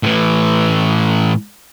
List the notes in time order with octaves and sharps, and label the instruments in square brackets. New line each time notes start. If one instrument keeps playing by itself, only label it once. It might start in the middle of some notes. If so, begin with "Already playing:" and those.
[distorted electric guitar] A2 E3